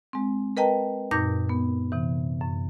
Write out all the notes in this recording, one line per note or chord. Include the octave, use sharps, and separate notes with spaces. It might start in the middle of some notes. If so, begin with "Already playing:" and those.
G#3 C4
A#4 B4 D#5 G5 A5 A#5
F#2 A#2 D#4 D6 G6 A#6
B3
C3 E3
F#2